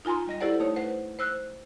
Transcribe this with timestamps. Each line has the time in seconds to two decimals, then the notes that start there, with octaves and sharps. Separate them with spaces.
0.05 D#4 F4 G#5 A#5 C6
0.27 G3 D#5 A#6
0.40 E4 G4 A4 C5 D5 F#5
0.60 A3 D#4 C#5
0.76 B4 C5 F#5
1.19 C5 E6 F#6